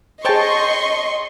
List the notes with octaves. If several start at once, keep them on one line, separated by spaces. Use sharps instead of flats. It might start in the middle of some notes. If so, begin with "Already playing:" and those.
G#4 C5 C#5 D#5 G5 A5 C6 C#6